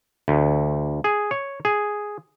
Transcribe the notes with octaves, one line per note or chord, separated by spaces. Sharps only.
D2
G#4
C#5
G#4